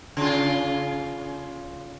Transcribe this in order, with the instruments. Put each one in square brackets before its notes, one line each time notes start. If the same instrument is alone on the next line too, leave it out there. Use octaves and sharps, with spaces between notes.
[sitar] C#3 F4